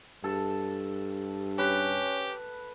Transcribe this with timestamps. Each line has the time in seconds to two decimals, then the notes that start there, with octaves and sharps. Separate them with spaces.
0.24 G2 A4
1.59 C#4 G4 B4